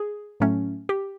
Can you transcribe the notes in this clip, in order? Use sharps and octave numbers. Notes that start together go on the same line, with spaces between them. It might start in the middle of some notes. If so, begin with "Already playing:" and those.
Already playing: G#4
A2 F#3 A3 C#4
G4